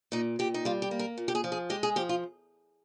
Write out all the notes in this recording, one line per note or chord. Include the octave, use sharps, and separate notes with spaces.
A#2 D#4
A#2 G4
D#4
G3 F4
G4
A#3
A#4
A#2
G4
G#4
F3
G#4
G#3 G4
G#4
F3 G4
F4